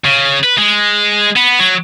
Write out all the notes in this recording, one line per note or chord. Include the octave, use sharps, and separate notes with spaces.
C#3
B4
G#3
B3
F#3